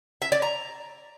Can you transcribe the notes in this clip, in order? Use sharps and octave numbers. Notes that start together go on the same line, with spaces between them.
E5
D5
A#5